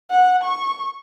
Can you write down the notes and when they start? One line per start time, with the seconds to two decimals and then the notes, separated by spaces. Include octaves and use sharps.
0.10 F#5
0.44 C#6